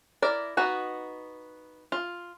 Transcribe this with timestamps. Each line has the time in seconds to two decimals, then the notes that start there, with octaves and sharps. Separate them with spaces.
0.22 E4 A#4 D5
0.57 B3 D#4 F#4
1.92 F4